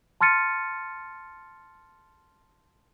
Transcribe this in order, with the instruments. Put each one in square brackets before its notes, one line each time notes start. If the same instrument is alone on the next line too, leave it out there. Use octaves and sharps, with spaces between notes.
[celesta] A5 C6 F6 A6 C#7 D#7